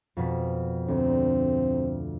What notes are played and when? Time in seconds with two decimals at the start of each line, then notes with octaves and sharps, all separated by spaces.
0.17 F2 B2 B6
0.88 D2 C4